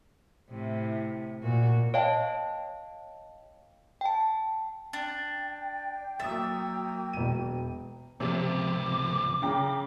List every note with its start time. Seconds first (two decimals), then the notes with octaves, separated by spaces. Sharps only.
0.50 A2 C3
1.42 A#2 F#4
1.94 C#5 D#5 F5 G5 A5
4.01 G5 A5
4.93 D4 G5
6.20 F#3 A#3 E5 D#6 A6
7.13 E1 D#7
8.20 C#2 C3 F3 D6
9.42 C#3 G5 A#5